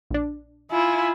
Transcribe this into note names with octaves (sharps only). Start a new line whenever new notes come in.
A#1 D4
E4 F4 G#5